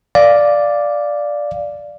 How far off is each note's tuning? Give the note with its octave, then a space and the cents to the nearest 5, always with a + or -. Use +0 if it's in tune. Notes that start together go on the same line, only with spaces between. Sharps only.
D5 +0 F5 +0